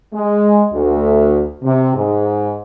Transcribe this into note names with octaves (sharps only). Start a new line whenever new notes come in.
G#3
D2
C3
G#2